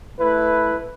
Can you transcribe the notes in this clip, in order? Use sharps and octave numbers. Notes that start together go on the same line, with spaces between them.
A3 E4 B4